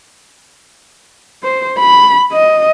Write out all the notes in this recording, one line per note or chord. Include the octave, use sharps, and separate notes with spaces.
C5
B5
D#5